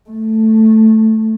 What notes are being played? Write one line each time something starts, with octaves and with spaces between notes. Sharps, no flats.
A3